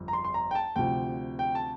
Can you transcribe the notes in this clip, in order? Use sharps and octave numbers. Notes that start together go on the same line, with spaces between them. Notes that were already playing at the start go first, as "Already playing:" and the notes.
Already playing: G1 F2
A#5
C6
C6
A#5
G5
A5
D2 C3 F3 G5
G5
A5